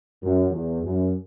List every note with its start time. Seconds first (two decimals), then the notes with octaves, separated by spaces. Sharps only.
0.21 F#2
0.50 E2
0.82 F#2